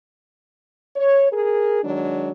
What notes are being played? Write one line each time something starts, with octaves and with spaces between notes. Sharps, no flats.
C#5
G#4 A#4
D#3 F#3 G#3 D4